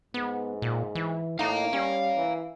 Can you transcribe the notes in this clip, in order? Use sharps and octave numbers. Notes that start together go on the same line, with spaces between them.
G#2 B3
A#2
E3
A2 D#4 F5 A#5
G3 C#4
E3